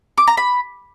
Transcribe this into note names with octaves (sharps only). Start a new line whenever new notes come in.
D6
A#5
B5